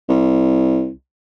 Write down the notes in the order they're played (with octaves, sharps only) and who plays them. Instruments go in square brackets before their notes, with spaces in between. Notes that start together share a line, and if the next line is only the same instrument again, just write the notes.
[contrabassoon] C2